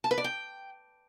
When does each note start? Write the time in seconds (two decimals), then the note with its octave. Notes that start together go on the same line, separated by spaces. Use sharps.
0.04 A5
0.11 B4
0.18 D5
0.24 G5